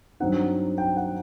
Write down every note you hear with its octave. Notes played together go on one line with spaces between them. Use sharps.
G2 F#3 C4 D#4 F#5
G5
F#5